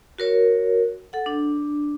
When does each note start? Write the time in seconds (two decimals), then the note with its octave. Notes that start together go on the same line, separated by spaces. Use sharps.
0.19 F#4 A#4 C#5
1.13 A4 F#5
1.26 D4